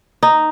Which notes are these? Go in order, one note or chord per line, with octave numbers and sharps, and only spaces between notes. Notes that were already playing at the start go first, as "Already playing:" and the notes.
D#4